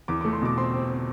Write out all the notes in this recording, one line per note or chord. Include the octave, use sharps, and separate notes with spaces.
E2 D6
D6
A3
C6
B2 D6
C4 C6
C4
C4